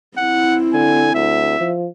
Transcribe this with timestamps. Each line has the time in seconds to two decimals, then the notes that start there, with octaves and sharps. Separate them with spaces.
0.18 C4 E4 F#5
0.74 D3 G#5
1.15 D2 E5
1.60 F3